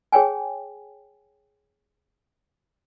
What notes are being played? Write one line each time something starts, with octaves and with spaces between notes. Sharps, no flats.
G#4 C#5 G5 G#5